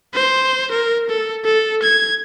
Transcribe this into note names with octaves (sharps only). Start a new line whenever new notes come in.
C5
A#4
A4
A4
G#6